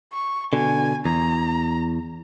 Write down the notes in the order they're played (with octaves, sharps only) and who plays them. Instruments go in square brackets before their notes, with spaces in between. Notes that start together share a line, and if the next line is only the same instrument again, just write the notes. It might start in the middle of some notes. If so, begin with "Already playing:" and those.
[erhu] C#6
[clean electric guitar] B2 D3 [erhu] G#5
[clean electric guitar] E2 [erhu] A#5